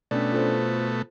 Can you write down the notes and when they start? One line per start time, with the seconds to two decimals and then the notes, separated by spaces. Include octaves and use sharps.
0.11 B2 A3 C#4 D4 D5
0.32 F4 A4 C5